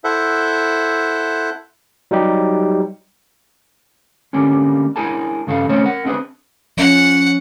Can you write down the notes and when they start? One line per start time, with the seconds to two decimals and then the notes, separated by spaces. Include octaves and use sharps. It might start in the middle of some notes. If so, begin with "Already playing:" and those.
0.04 E4 A4 C5 E5 F#5
2.11 F#3 G3 D#4 G4
4.33 D3 G3 A#3 C4 C#4
4.96 D4 E4 G#4 A#4 G#5 A5
5.47 G2 C#3 A4 A#4 F5
5.69 C3 A3 C4 C#4 C5 C#5
5.83 A#4 F#5
6.05 C4 D4 E4 G#4 B4 C5
6.77 F3 C#4 F#5